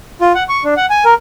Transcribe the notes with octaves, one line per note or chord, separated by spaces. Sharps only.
F4
F#5
C#6
D4
F#5
G#5
A#4